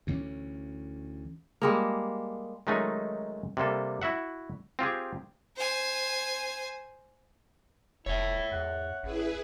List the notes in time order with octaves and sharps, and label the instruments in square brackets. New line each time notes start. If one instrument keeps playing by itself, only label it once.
[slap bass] D2 E3 C4 C#4
[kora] G3 G#3 A#3
[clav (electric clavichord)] D#3 F#3 G#3 A3 C#4 D#4
C3 G3 A#3 A4
E4 F#4 E5 F#5
C4 F4 G4 G#4
[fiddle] C5 G#5
[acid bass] F1 [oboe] E4 [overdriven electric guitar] C#5 E5
[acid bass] E2 [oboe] F#5
[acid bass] A1 [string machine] E4 G#4 B4